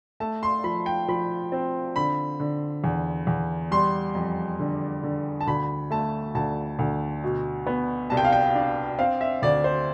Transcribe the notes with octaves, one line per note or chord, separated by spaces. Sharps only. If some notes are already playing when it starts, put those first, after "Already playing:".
A3 A5
C6
F3 B5
G5
F3 B5
C4
D3 B5
D3
E2
E2
G3 C6
F2
D3
D3
A5
D2 B5
A3 A5
D2 A5
D2
B2
B3
C2 A5
G5
F5
G5
D4
C4 F5
E5
D2 D5
C5